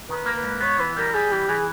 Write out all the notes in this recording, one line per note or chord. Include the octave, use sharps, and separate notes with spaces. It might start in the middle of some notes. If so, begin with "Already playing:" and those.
D#3 B4
A#3
B4
G#2
B3 C#5
E3 B4
G3 A#4
G3 G#4
E3 G4
E3 G#4